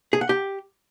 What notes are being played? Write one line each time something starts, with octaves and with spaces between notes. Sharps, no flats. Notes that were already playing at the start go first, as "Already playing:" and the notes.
G#4
F#5
G4